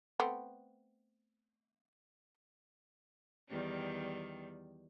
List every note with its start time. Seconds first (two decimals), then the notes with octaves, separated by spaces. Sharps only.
0.20 A3 B3 C4
3.49 E2 D#3 G3